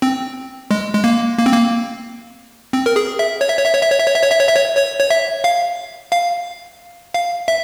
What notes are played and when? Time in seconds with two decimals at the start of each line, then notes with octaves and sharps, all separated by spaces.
0.02 C4
0.71 G#3
0.94 G#3
1.04 A#3
1.38 A#3
1.46 C4
1.53 A#3
2.73 C4
2.86 A#4
2.96 G#4
3.19 E5
3.41 C#5
3.49 E5
3.58 C#5
3.66 E5
3.74 C#5
3.82 E5
3.91 C#5
3.99 E5
4.07 C#5
4.15 E5
4.23 C#5
4.31 E5
4.40 C#5
4.49 E5
4.56 C#5
4.77 C#5
5.00 C#5
5.10 E5
5.44 F5
6.12 F5
7.14 F5
7.48 E5